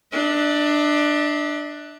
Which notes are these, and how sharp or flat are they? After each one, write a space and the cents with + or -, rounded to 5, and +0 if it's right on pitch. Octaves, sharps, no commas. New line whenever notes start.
D4 +15 E5 -40